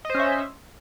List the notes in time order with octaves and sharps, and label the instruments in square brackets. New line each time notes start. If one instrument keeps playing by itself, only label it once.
[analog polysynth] D#5
C5
C#4
E5